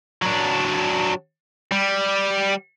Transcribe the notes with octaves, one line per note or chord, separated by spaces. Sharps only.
F#3 D4
G3